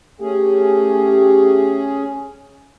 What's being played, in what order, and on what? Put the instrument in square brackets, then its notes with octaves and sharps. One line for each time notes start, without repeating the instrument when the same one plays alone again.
[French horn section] A3 G4 [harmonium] C#4 G#4